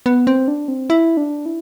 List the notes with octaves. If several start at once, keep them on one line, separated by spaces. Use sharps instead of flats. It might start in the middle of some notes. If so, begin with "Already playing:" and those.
B3
C4
D4
C4
E4
D4
E4